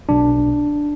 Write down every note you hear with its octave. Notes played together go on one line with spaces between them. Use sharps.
B1 B2 D4